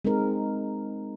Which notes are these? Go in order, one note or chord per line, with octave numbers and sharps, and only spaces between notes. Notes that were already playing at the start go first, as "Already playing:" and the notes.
G#3 C4 D#4 A#4